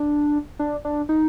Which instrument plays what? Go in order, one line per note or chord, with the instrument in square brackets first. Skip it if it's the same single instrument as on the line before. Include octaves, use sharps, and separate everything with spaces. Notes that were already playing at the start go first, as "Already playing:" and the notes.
Already playing: [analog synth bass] D4
D4
D4
D#4